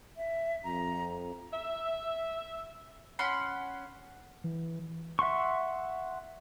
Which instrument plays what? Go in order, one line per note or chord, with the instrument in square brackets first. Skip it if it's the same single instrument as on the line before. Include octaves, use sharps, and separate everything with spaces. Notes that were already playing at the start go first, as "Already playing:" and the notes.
[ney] E5
[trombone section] F2 [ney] A#5
[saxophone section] E5
[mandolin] C#4 F#5 B5 C6
[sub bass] E3
[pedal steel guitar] E5 F#5 C6 C#6